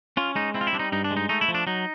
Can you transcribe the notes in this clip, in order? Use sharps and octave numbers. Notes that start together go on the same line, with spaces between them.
C#4 F4
G#3 D#4
C4 E4
F4
E4
G3 D4
D#4
G2 D#4
D4
G#3
D#4
A3 D#4
E4
F3
D4
F#3 D#4